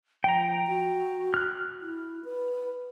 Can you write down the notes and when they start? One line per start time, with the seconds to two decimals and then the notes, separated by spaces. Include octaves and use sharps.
0.24 F3 G5 A#5
0.67 F#4
1.34 F6 F#6
1.81 E4
2.25 B4